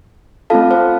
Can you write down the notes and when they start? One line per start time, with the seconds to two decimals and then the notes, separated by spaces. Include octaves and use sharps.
0.50 A3 C4 F4 A4 F5 A5
0.71 C5 F5